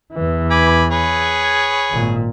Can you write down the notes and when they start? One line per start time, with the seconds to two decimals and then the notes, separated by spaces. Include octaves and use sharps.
0.13 E2 E3
0.51 G#5 B5 D6
0.91 G#4 B4 C#5
1.91 G#1 A#2